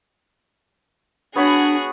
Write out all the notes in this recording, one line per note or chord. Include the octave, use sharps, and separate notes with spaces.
B3 D4 F#4 G#4 C#5 B5